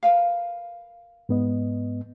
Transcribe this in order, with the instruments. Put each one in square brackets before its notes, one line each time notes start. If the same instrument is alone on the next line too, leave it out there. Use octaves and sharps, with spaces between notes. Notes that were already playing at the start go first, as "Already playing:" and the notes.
[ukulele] A#4 B4 F5
[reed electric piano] G#2 B3 D#5